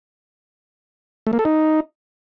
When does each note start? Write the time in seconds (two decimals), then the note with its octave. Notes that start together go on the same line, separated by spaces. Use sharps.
1.27 A3
1.33 A#3
1.39 A4
1.45 D#4